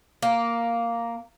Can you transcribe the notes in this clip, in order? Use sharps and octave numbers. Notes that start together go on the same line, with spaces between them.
A#3